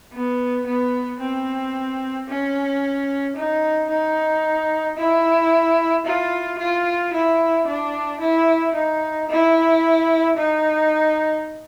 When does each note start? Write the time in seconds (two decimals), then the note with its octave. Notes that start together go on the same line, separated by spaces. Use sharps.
0.13 B3
0.67 B3
1.20 C4
2.28 C#4
3.36 D#4
3.89 D#4
4.97 E4
6.06 F4
6.59 F4
7.13 E4
7.68 D4
8.21 E4
8.75 D#4
9.30 E4
10.37 D#4